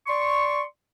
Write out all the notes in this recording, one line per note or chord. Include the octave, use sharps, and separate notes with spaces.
D5 C6 C#6